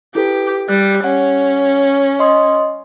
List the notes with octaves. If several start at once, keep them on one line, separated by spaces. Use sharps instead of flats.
E4 G4 A4 B4
G3 F#6
C#4 F#5
D#5 C6 D#6